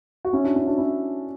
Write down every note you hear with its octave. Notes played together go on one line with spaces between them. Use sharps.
F#4
C#4 E4
D4 F#4
C#4 E4
D4 F#4
C#4 E4